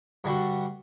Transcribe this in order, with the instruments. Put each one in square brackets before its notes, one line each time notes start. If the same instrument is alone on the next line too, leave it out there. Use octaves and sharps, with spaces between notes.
[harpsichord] G2 D3 G3 F#4